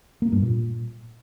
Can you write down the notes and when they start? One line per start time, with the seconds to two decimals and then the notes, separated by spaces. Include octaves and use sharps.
0.22 A#3
0.32 G2
0.42 A#2